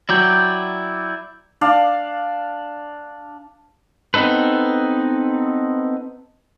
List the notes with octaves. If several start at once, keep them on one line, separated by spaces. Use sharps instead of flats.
F#3 E4 D5 G5
D4 D5 F5
B3 C4 D#4 A4 B4